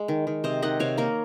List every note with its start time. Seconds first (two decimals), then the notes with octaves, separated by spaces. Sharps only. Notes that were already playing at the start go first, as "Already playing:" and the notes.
Already playing: G#3
0.08 D#3
0.27 D#3
0.44 C3 C5 D#5
0.62 D#3 D#5 F#5
0.80 C3 C#5 F5
0.98 A#3 A#4 C#5